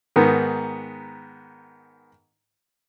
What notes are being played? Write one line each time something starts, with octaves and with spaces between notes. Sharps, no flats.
G#2 D#3 B3